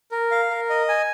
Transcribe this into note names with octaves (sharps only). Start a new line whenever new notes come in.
A#4
F5
A#4
D#5
G#5